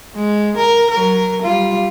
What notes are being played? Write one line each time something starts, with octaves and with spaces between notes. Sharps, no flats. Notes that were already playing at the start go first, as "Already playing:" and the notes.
G#3
A#4
F#3 A#4
G3 F4